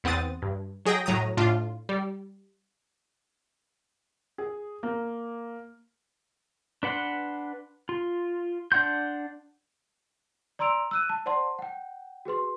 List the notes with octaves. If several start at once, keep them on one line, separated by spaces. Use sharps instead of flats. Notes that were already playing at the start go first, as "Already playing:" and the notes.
E2 B3 C4 F#5 D#6 A6
G2
F#3 G#4 D#5 G5 A#6
A2 F#3 A#5 D#6
A2 D4 F4
G3
G#4
A#3
D4 B4 F#5 C6
F4
D4 D5 F#5 C6 G6
D5 A#5 C6 E6 D7 F7
E6 F#6 D#7
A5
C5 D5 F#5 A5 C6
F#5 G5
F#4 G#4 B4 C6